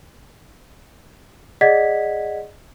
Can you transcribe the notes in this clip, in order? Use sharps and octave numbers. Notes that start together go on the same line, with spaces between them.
G#4 D5 D#5 F#5 G#6 B6